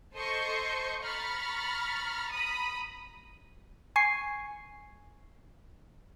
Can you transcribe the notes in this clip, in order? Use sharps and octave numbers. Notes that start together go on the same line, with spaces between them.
A4 C5 D#5 C6 C#6 G6
A#5 B5 C#6 F6 A6
A#5 B5 D#6
G#5 C#6 C7